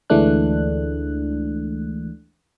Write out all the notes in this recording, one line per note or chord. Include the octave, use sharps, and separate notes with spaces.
D2 E3 G#3 A3 D4 F#6